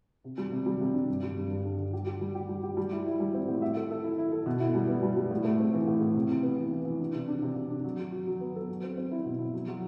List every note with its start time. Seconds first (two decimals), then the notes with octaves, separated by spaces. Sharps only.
0.24 C3
0.38 G3
0.52 C3
0.66 G3
0.81 C3
0.94 D4
1.09 G2
1.23 G3
1.37 G2
1.50 G2
1.64 D3
1.79 D3
1.93 G4
2.06 G4
2.21 G3
2.35 G4
2.49 G3
2.63 G4
2.77 G3
2.92 E4
3.06 E4
3.20 G3
3.34 C4
3.48 A2
3.62 E5
3.76 A4
3.91 A4
4.04 E4
4.18 E4
4.32 A4
4.46 B2
4.60 E4
4.75 G3
4.88 B3
5.03 G3
5.17 G3
5.31 A2
5.45 A3
5.60 C4
5.73 E3
5.87 A2
6.01 A2
6.16 C3
6.29 C3
6.43 B3
6.58 E3
6.72 E3
6.85 E3
7.00 D4
7.15 C3
7.28 D4
7.42 C3
7.56 C3
7.70 D4
7.84 F#3
7.99 F#3
8.12 F#4
8.27 F#3
8.41 B3
8.55 A4
8.68 F#3
8.83 C4
8.98 C4
9.12 E4
9.25 B2
9.39 E4
9.54 F#3
9.68 F#3